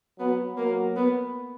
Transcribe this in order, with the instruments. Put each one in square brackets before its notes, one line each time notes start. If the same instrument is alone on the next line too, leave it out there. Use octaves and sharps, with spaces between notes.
[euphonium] F#3 [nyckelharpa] B3
[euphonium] F#3 [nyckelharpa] A#3
[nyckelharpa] B3